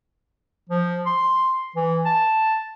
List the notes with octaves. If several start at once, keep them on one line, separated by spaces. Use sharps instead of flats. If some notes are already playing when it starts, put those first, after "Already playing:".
F3
C6
E3
A5